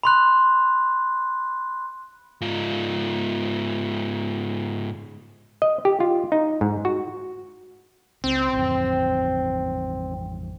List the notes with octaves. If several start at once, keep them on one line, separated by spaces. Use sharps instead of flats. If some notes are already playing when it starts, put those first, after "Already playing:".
B5 C6 F#6
G#2 F4
D#5
G4
F4
D#4
G#2
F#4
C#2 C4
A1 F2